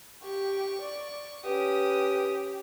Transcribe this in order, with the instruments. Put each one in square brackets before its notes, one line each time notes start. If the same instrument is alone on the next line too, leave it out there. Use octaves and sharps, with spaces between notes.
[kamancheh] G4 [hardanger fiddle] C#6
[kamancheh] D5
[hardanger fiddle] C#4 D#6 [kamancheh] G4 [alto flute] B4